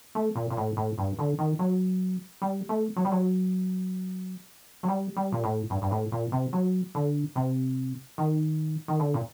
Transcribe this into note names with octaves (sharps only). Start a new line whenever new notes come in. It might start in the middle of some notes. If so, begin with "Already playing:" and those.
A3
A#2
A#2
A2
A2
G2
D3
D#3
F#3
G3
A3
F#3
G3
F#3
F#3
G3
G3
A#2
A2
G2
G2
A2
A#2
C3
F#3
D3
C3
D#3
D#3
D3
A#2